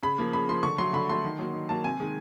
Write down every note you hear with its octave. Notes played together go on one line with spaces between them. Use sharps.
C#3 B5
F3 A#3
C#3 B5
F3 A#3 C6
D3 C#6
F#3 A3 C6
D3 B5
F#3 A3 C6
D#3
F#3 A#3
D#3
F#3 A#3 A5
C3 G#5
D#3 G#3